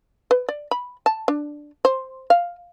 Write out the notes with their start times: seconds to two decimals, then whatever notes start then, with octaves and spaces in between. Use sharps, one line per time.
0.31 B4
0.49 D5
0.71 B5
1.06 A5
1.28 D4
1.85 C5
2.30 F5